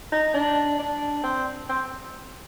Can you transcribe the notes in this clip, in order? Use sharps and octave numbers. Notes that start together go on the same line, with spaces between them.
D#4
D4
D4
C4
C4